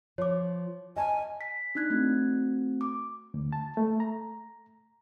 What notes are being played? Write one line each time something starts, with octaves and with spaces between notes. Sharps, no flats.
F3 C#5 D6
D#5 G#5 A5
B6
D4 D#4 F#6 G#6
A3 C4 F#4
D6
D2
A5
A3
A#5